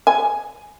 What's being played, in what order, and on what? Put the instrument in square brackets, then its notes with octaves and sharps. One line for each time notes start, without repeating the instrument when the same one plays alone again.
[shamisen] G#5